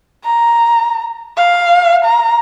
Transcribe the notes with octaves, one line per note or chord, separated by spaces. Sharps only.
A#5
F5
A#5